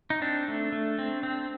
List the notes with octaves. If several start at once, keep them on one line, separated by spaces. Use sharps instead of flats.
D#4
C4 D4
A3
A3
C4
C4